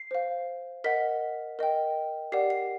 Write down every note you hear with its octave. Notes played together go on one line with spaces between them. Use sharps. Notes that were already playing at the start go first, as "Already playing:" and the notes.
Already playing: C7
C5 F5
A#4 D#5 F#5 B6
A#4 D#5 G5
G4 A#4 D5 F#5 C7
C7